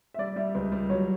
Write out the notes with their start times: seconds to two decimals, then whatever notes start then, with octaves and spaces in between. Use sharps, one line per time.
0.14 E5
0.18 G3 D5
0.36 G3 E5
0.55 C#2
0.72 G3
0.90 F#3 C#5